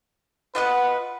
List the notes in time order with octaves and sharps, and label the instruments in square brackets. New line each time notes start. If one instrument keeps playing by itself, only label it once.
[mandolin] F4 D#5 F#5 [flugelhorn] B4